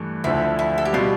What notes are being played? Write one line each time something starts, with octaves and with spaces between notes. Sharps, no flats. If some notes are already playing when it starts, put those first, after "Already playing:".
Already playing: G2 E3 A3
D2 D3 F3 E4
E4
A4
G4
B2 G3 F4